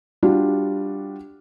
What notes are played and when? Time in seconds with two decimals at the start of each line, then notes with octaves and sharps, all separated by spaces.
0.23 G3 D4 F4 F#4